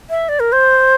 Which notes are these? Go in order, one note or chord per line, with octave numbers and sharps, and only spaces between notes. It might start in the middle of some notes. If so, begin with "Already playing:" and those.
E5
D5
A#4
C5